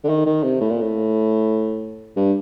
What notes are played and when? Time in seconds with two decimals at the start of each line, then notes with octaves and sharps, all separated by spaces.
0.04 D3
0.09 D#3
0.26 D#3
0.43 C3
0.61 A2
0.70 A#2
0.82 A2
2.16 G2